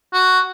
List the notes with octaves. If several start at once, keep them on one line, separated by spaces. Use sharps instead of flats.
F#4